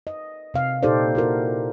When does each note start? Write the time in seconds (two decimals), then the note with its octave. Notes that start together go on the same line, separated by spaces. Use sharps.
0.07 D#5
0.54 C3 F5
0.83 A#2 D#4 G4 A4 C5 D5
1.15 E4 F#4 A#4